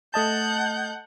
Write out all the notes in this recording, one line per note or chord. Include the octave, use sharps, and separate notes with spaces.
A3 D#5 F#5 A5 G6